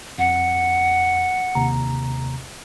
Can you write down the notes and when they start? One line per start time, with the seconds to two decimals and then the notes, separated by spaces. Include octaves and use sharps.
0.18 F2 F#5
1.55 D#2 C3 A#5